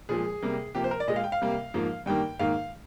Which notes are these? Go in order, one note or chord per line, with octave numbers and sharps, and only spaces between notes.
A#2 F3 G#3 G#4
C3 G3 A#3
C3 F3 A#3 G4
C5
A#4
D5
A#2 G#3 D#5
F5
G5
F5
C3 G3 A#3
G#2 F3 A#3
G2 D#3 G3 A#3 G5
G#2 D#3 A#3 F5